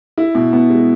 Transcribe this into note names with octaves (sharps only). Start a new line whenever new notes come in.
E4
B2
B3
G#3